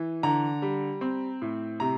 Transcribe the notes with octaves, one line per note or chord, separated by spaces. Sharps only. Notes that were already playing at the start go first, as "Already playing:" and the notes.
Already playing: E3
D3 A#5
G3
C4
A2
C3 A#5